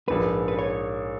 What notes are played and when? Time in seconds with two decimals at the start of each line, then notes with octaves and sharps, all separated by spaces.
0.08 A#1 G#2 F3 A#3 B4
0.48 B4
0.59 C#5